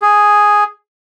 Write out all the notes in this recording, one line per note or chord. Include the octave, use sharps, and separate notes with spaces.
G#4